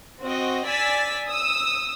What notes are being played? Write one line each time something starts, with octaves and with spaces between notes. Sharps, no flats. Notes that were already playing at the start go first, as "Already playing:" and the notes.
C4 F#4 D#5
D5 G#5 E6 A6 B6
D#6 E6